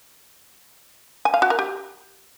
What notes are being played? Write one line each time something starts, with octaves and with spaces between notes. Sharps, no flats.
G#5
F5
F#4
A#4
G4